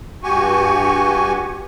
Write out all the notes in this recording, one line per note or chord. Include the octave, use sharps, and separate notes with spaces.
G2 F#4 G4 G#5 C#6